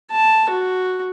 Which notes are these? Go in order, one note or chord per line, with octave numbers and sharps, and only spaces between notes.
A5
F#4